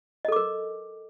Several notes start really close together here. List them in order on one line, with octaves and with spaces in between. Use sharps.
D#5 A4 D6 A#4